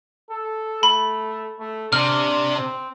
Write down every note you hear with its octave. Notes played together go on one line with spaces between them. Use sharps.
A4
A3 B5
A3
C3 D4 F6
C4